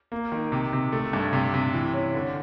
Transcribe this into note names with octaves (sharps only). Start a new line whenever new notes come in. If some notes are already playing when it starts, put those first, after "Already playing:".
A#3
D#3
C3
C3
A3
G2
C3
C3
E3
C#4
D3